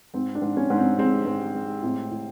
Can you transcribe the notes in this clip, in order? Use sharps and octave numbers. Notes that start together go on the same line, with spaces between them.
G#2 C4
D4
G#2
C#4
G#2
C4
G#3 C4
G#2
G#3
A2 C4
A2